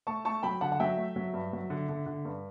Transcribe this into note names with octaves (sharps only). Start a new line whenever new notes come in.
A3 A5 C#6
A3 A5 C#6
F#3 G5 B5
D3 F#5 A5
F#5
F#3 E5 G5
A3
F#3
G2
F#3
D3
D3
D3
G2